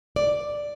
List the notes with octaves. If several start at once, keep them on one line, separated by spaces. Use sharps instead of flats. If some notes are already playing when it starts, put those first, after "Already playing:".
D5